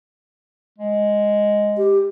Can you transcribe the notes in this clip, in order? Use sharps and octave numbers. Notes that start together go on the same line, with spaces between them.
G#3
G4